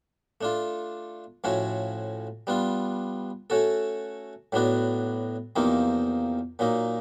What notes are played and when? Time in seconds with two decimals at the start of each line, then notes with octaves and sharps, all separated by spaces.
0.41 A3 D4 F4
1.44 A2 F3 A3 C#4 F#4
2.47 G3 B3 D4 F4
3.50 A3 C#4 F#4 A4
4.52 A2 F#3 B3 D4 F#4
5.56 E2 C3 F3 A#3 D#4
6.59 A#2 F#3 A#3 D#4